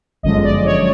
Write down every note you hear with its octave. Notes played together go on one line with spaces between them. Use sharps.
G1 F#2 D3 F3 G#3 D#5
D5
C#5